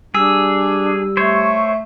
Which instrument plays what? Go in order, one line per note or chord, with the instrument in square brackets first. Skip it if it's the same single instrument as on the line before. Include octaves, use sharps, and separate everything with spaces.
[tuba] G3 [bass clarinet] D4 [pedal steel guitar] G#4 [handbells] E6
[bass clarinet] A3 [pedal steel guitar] C5 C#5